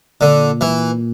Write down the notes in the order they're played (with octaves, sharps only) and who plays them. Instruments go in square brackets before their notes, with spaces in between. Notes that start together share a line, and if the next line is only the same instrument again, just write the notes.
[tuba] A#2 [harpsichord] D3
[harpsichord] E3